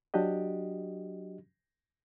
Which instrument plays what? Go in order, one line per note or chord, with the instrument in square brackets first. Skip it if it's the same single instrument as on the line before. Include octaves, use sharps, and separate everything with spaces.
[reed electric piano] F#3 D4 F#4 G4 D#5